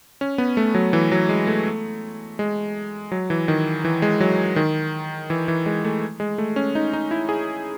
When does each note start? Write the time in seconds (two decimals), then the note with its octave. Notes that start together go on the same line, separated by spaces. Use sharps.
0.21 C#4
0.38 B3
0.57 A3
0.75 F#3
0.93 E3
1.12 F#3
1.29 G#3
1.47 A3
2.39 G#3
3.12 F#3
3.30 E3
3.48 D#3
3.85 E3
4.02 G#3
4.20 F#3
4.56 D#3
5.30 E3
5.48 E3
5.66 G#3
5.84 A3
6.20 G#3
6.38 A3
6.56 C#4
6.75 D#4
6.93 D#4
7.11 E4
7.29 G#4